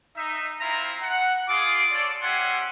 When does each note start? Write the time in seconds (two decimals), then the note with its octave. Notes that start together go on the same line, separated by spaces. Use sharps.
0.16 D#4 E5
0.60 C4 E4 F4 E5 A#5
1.02 F#5
1.49 F4 G#4 D6
1.92 F4 A4 C#5 D5
2.22 C#4 G4 E5 F#5 G#5 C6